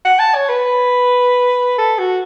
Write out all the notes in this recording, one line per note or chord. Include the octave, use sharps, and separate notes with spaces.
F#5
A5
C#5
B4
A4
F#4